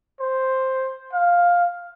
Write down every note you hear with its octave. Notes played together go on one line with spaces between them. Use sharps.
C5
F5